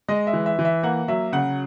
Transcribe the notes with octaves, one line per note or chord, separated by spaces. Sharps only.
G#3 D#5
E5
E3
E5
E3
E5
A#3 F#5
F#3 E5
C#3 F#5